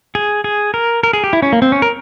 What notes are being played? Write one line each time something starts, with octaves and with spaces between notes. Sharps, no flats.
G#4
G#4
A#4
A#4
G#4
G4
E4
C#4
A#3
C4
C#4
A#4